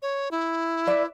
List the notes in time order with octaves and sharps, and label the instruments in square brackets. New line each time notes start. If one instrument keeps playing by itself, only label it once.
[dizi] C#5
E4
[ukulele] B4 D5 E5